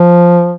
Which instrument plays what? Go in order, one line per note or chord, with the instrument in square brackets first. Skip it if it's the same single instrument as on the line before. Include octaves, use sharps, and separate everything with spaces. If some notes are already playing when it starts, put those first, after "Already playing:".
Already playing: [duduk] F3